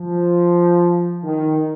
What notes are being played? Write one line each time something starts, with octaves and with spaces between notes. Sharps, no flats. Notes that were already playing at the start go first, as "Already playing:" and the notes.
Already playing: F3
D#3